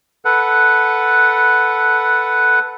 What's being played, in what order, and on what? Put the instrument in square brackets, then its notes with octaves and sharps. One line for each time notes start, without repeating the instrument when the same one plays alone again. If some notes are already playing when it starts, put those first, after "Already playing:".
[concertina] A4 B4 F#5